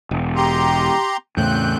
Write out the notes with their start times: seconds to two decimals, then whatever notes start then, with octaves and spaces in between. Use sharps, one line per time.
0.11 E1
0.36 G4 A#5 C6
1.37 E2 A2 C#3 C4 F#6 G6